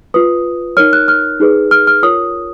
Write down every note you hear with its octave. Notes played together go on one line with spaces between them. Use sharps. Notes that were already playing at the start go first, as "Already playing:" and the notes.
F4 B4 D#6
D#4 A#4 C#5 F6
F#6
F6
D#4 G#4 B4
F6
F6
F4 A#4 C#5 D#6